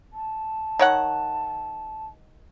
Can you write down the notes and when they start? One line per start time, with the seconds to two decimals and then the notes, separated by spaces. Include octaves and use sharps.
0.13 A5
0.79 D#3 C#5 F#5